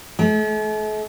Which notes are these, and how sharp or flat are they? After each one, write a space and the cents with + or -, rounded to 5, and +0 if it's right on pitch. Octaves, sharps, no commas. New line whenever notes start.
A3 -45